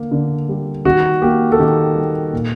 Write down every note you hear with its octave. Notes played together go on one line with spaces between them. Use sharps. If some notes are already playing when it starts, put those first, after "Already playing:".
Already playing: D3 A#3
D3
G3
D#3 F#4
A#3 G4
A4
D#3 G4
G3
A#2